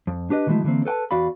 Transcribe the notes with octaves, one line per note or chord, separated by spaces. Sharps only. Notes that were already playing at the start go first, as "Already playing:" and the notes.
F2
D4 G4 B4 D#5
D#3 E3 F#3 G#3 A3 E4
D3 E3 G#3 A#3 C4
A4 B4 G5 A5
E2 F#4 D5 F5 B5